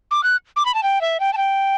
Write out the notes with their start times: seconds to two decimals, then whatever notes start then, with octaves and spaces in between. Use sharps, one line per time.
0.11 D6
0.23 F#6
0.56 D6
0.65 B5
0.74 A5
0.83 G5
1.01 E5
1.20 G5
1.33 A5
1.37 G5